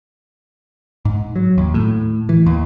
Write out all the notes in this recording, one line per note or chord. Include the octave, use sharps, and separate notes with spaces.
G#2
F#3
D#2
A2
E3
D#2